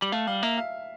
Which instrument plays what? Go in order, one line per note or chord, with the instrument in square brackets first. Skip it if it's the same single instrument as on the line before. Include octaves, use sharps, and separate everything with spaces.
[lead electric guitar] G3
[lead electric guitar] A3 [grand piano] F5
[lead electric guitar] G3 [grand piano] F5
[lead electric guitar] A#3 [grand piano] E5
[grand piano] F5